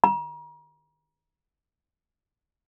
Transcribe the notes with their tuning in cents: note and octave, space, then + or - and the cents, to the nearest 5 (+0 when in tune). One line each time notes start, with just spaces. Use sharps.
A#5 +40